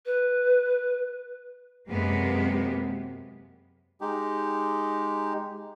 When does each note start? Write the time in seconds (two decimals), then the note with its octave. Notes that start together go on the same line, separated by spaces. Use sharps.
0.06 B4
1.89 F#2 C3 G#3 A#3 B3
4.01 G#3 D#4 G4